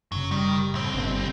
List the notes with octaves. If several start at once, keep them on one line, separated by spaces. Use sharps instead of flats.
F#1 C#3 F#3
D#3 G3
C2 A2 C4
G1